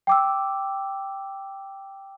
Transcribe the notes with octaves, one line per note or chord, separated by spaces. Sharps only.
G5 D6 E6